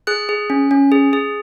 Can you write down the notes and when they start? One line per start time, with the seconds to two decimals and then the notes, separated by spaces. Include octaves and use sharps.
0.07 G#4 F#6
0.29 G#4
0.50 C#4
0.71 C#4
0.92 G#4
1.13 G#4